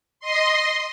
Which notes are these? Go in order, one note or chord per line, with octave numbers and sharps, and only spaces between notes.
D#5 C6